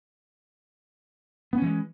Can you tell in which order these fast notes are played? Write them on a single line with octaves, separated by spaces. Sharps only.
B3 C#4 E3 G#3